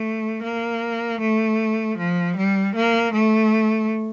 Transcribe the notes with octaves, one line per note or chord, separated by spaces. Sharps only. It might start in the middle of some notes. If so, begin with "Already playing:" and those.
Already playing: A3
A#3
A3
F3
G3
A#3
A3